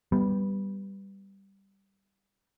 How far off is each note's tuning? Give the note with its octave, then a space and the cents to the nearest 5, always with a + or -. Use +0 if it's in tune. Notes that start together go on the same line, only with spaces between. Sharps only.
G3 +0 B3 +0